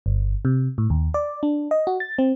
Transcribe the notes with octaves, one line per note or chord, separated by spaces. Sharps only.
G1
C3
A2
D#2
D5
D4
D#5
F#4
A6
C4